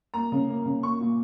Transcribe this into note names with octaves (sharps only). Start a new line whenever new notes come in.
A#3 A#5
C#3
A#3
C#3
A#3 C#6
A#2